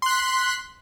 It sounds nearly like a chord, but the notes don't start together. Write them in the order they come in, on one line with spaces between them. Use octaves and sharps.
C6 F#6 B6